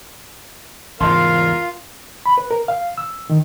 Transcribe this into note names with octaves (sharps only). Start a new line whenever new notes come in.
E2 G#2 C#3 F4 A#4 F5 A5 C6
B5
B4
A#4
F5
E6
D#3